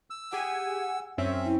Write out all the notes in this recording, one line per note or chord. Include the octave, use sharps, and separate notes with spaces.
E6
G4 G#4 F#5 G#5
F#2 C4 C#4 E5
E4